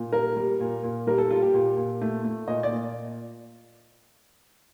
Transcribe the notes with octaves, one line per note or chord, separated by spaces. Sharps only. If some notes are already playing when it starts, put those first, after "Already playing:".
Already playing: A#2
G3 A#4
G3
A#2
A#2
G3 A#4
A4
G3 F4
G4
A#2
A#2
A3
A3
A#2 D#5
D5
A#2